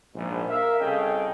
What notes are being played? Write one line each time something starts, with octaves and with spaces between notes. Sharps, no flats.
A#1 G#2
A#4 E5 F5
C2 C#3 A4 D#5 G5